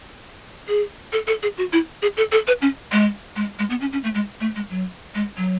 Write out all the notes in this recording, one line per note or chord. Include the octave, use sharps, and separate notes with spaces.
G#4
A4
A4
G#4
F#4
E4
G#4
A4
A4
B4
C#4
G#3
G#3
G#3
B3
C#4
C#4
A3
G#3
A3
G#3
F#3
G#3
F#3